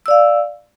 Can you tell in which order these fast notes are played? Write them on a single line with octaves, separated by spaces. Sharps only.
E6 D5 F5